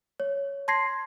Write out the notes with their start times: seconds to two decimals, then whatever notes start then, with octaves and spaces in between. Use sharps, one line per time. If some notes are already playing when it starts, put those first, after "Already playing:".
0.20 C#5
0.68 A5 C6 G#6 A#6 C7